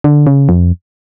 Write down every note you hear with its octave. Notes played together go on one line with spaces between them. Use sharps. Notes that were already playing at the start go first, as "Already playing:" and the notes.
D3
C#3
F2